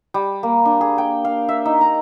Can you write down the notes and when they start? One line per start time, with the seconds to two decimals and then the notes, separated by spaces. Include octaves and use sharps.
0.14 G3
0.43 A#3
0.65 D4
0.81 G#4
0.98 G5
1.25 F5
1.49 E5
1.65 D#4
1.81 A#5